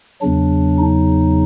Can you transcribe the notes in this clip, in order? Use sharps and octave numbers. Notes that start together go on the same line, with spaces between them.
E2 C#3 F#3 D4
D#4